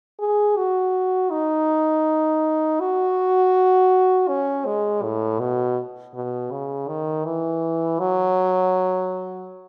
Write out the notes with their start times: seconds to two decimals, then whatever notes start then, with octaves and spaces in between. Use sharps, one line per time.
0.20 G#4
0.57 F#4
1.31 D#4
2.80 F#4
4.28 C#4
4.66 G#3
5.03 A2
5.40 B2
6.14 B2
6.52 C#3
6.88 D#3
7.25 E3
8.00 F#3